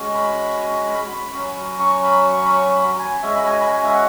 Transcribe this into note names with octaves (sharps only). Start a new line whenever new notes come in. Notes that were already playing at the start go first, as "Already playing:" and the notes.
Already playing: G#3 C#4 F#4
B5
B5
B5
F#3 C#4 F#4
C#6
B5
C#6
B5
C#6
B5
G#5
G#3 C#4 F#4 E5
B5
G#5
B5
G#5
E5
F#5